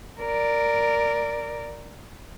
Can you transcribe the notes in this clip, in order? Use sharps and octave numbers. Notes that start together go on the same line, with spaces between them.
A#4 D5